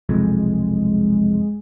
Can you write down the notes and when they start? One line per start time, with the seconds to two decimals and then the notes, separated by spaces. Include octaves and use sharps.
0.09 F1 B1 F2 G#3